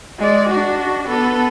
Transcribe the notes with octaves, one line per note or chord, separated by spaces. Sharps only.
G#3 D5
D4 F#4
B3 A4